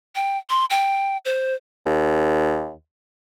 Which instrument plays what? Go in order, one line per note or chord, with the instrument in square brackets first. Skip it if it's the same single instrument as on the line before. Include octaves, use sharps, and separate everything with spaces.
[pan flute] G5
C6
G5
C5
[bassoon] D#2